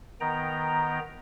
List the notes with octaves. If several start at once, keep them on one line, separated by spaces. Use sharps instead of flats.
D#3 B3 G5 A#5